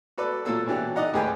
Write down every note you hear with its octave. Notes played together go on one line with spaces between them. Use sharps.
F#4 A4 B4 D5
A#2 F#3 A#3 A4 E6
B2 E3 C#4 D4 F#4 G4
D#4 D5 D#5 F#5 A#5
D#2 A2 G4 G#4 B4 G5